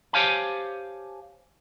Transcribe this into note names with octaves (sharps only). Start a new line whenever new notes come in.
G4 C5 C#5 F5 G#5 A5